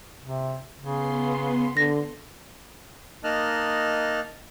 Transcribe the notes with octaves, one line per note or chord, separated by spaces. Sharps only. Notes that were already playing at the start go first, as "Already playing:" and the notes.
C3
C#3 B3 C6
D3 A#6
A#3 D#4 D#5 A5 F6 F#6